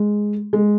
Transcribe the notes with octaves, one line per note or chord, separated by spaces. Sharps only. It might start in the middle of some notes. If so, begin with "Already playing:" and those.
Already playing: G#3
G#3